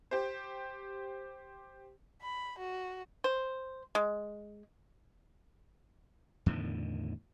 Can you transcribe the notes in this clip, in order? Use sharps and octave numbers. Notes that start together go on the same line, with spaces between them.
G4 C5
B5
F#4
C5
G#3
E2 A2 D3 D#3